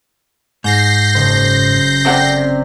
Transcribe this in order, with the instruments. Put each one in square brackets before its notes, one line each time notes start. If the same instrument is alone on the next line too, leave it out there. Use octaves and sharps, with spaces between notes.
[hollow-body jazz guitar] G#2 [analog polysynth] G6 A#6 C7
[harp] F#1 [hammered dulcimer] C5
[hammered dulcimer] C3 D5 [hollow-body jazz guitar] C4 A4 F#5